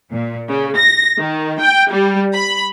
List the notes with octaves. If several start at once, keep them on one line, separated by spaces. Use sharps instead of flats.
A#2
C#3
A#6
D#3
G5
G3
B5